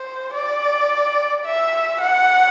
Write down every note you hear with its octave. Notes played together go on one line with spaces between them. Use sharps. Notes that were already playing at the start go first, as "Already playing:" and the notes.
Already playing: C5
D5
E5
F#5